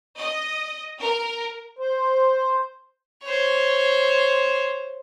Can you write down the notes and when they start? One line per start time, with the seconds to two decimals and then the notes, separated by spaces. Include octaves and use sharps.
0.18 D#5
0.99 A#4
1.79 C5
3.24 C5 C#5